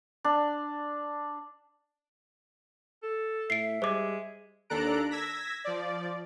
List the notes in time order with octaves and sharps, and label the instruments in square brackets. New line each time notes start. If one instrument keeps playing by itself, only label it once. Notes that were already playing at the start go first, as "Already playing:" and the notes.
[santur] D4
[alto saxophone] A4
[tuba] A2 [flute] E5 [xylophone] C7 D7
[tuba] G3 [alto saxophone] G#3 [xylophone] C5 D6
[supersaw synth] D#2 D4 A4 A#5 F#6 D7
E6 G#6 A#6 B6
F3 D5